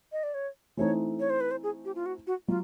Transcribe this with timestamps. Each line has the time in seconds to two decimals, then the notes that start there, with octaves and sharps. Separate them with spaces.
0.12 D#5
0.23 D5
0.34 C#5
0.77 E3 A3 C4 D#4 C#5
1.20 C#5
1.30 C5
1.41 B4
1.51 C5
1.63 G#4
1.85 G4
1.95 F4
2.06 F#4
2.27 F#4
2.48 F#3 F4